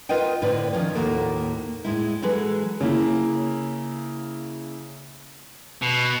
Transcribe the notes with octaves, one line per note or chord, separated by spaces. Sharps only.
F4 A#4 B4 D#5 F5 G5
A2 D3 B4 C5 D5
D#3 F3 C#4
D#2 A2 A#3 F#4 A4 A#4
A2 G#3 E4
E3 F#3 G#3 G#4 A4 B4
C#3 A#3 E4
B2